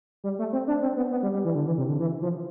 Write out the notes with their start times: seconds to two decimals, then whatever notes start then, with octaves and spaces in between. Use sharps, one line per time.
0.24 G3
0.39 A3
0.53 C4
0.68 D4
0.83 C4
0.97 B3
1.11 B3
1.23 G3
1.34 G3
1.45 E3
1.55 D3
1.67 E3
1.78 C3
1.89 D3
1.99 E3
2.22 F3